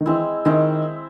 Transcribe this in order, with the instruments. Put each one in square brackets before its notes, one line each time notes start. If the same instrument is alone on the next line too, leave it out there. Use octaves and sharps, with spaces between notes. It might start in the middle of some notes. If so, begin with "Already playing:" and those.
[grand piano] D#3
[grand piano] E3 [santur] G#3 C4 E4
[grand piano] D#3 [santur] G#3 C4 E4